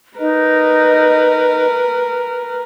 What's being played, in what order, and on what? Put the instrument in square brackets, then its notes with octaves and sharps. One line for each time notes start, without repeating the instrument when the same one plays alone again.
[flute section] D#4 D#5 [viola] A#4 B4